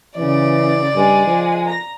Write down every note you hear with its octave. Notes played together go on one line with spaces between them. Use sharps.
C#3 E3 D5
G2 G#3 G#4
F3
A#5 A#6